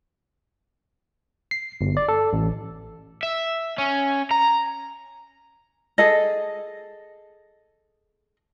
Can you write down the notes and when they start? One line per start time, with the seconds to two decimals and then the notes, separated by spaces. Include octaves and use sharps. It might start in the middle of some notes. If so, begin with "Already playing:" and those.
1.51 C7
1.81 G1
1.97 D5
2.09 A4
2.33 A1
3.23 E5
3.78 C#4
4.31 A#5
5.98 G#4 A4 D#5